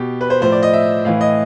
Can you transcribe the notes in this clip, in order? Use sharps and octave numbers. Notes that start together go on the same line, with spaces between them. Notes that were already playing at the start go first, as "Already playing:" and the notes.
Already playing: B2 G4
B4
C5
A2 F3 C5
D5
D#5
E5
A2 E3 F5
D#5